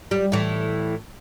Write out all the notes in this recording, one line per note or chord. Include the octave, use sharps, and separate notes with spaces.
G3
A2 E3